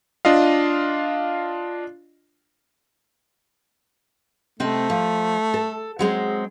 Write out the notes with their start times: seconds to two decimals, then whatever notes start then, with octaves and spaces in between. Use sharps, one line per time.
0.25 D4 F4 D#5 F5
4.60 C3 A3 C4 D#5
4.90 F3
5.54 A4
5.99 F#3 G#3 C4